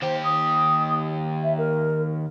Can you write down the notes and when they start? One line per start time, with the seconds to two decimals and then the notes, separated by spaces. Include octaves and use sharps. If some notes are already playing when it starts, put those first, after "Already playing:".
0.02 D#2 G4 C5
0.24 D#6
1.43 E5
1.58 A#4